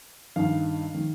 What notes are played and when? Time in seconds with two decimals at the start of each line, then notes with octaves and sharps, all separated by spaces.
0.36 G2 D#3 F5
0.94 D#3